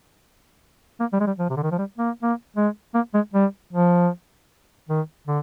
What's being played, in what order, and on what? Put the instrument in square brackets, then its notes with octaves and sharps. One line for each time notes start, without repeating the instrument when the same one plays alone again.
[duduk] A#3
G3
G#3
G3
F3
C3
D3
D#3
F3
G3
A#3
A#3
G#3
A#3
G#3
G3
F3
D#3
D3